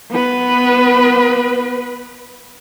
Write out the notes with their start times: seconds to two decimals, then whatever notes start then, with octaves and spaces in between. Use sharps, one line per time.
0.11 B3 B4